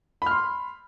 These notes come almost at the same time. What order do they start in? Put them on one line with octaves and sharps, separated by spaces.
B5 F6 C6